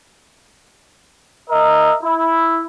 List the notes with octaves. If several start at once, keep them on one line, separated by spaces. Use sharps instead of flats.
A#4 D#5 E5
E4